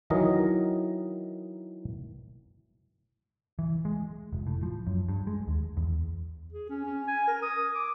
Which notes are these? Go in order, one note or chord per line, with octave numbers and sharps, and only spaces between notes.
D#3 E3 F#3 A#4 D#5
E3
G#3
F1
A2
F3
F#2
G2
G#3
D#2
E2
G#4
C#4
C#4
G#5
A#4
D#6
D6